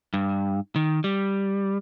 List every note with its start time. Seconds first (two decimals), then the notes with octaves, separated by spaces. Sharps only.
0.14 G2
0.76 D#3
1.04 G3